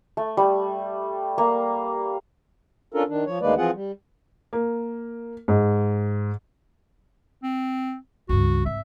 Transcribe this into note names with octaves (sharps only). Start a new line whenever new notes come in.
A3
G3
A#3
C#4 D4 F4 A4 A#4
D#3 D4
F3 C#5
D2 D#3 G#3 A#3 B4 D5
E3 F3 C4 F4 G#4 F#5
G3
A#3
G#2
C4
C#2 G2 F#4
G#1 E5